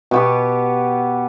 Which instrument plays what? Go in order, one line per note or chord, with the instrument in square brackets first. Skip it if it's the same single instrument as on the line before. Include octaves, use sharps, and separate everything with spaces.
[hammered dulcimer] B2 B3 G4